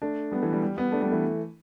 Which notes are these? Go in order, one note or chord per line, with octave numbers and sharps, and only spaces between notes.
A3 D4
G3 B3
E3 A3
G3
G3
G3 B3
A3 D4
G3 B3
E3 A3